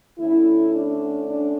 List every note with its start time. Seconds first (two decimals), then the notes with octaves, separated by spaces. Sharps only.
0.18 D3 A3 C#4 E4
0.74 D4
1.29 D4